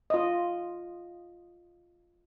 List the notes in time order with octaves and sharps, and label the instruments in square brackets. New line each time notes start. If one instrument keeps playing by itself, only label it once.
[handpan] F4 D#5